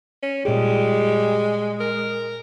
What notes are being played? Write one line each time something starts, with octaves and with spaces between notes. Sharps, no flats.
C#4
A#2 G3 G#3 G#4
A#4